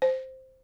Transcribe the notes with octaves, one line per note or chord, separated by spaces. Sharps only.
C5